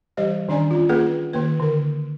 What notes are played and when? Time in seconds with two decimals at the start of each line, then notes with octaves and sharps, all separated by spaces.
0.17 E3 G3 G4 C5 D#5
0.49 D#3 C#4 D4 D5 G#5 A#5
0.71 C#4 F4
0.89 A#3 C#4 F4 G#4 B4 F#5
1.33 D#3 A#3 B4
1.60 D3 A#4